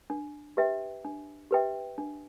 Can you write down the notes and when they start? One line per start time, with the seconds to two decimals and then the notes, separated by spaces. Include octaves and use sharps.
0.10 D4
0.57 G4 B4 E5 G5
1.05 D4
1.51 G4 B4 E5 G5
1.98 D4